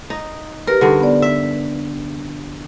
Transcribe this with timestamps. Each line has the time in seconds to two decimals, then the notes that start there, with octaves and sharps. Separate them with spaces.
0.10 D#4
0.67 G4 A#4 B4
0.81 G2 D3 D#4 F#5
1.01 B3 D5
1.22 E5